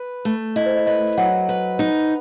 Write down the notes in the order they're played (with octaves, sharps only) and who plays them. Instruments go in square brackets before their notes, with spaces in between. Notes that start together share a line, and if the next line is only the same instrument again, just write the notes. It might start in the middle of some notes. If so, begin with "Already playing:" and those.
Already playing: [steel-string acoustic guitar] B4
A3
[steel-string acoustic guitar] E4 [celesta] D#5
[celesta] C5
D#5
[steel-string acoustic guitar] B4 [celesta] D#5
[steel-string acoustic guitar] F#3 [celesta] F#5
[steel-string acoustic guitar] B4
D#4